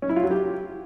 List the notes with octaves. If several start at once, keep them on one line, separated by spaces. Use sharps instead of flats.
C#4
E4
F4
F#3
G4